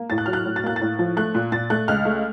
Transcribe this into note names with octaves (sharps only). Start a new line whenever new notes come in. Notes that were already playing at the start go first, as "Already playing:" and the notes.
Already playing: A#3
A2 A6
F#6
F#3 F6
F#6
A2
A6
A#3 F#6
A6
A2
F3
A3 F#6
A#2
A#2 A6
A3 F#6
C#2 F6
A3